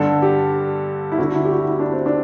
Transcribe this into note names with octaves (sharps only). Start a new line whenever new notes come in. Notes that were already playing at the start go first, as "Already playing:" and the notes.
Already playing: G2 D3 A4
G4
E4
D2 D3 F#4
E4
G4
F#4
E4
D4
C4
D4